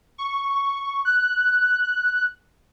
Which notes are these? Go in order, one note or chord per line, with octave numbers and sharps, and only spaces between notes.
C#6
F#6